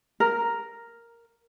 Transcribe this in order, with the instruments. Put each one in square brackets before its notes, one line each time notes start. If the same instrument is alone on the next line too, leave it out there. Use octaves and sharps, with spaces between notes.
[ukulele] A#4